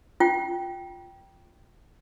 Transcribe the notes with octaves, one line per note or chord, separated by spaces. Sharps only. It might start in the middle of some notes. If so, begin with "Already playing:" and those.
F4 G5